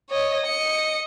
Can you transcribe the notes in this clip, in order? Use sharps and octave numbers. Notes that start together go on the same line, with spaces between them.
C#5 D#5
D#5 C#7